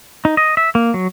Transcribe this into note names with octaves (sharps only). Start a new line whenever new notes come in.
D#4
D#5
E5
A#3
F#3